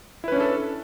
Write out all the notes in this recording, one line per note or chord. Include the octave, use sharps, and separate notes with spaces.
C#4 D4 E4 A4 B4